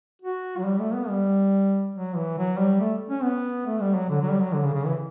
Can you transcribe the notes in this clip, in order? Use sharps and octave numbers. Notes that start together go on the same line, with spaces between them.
F#4
F#3
G3
A3
B3
G3
F#3
E3
F#3
G3
A3
C#4
B3
A3
G3
F#3
D3
F#3
G3
F#3
D3
C#3
C#3
E3